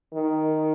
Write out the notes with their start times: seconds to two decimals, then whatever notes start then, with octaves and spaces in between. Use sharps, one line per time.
0.14 D#3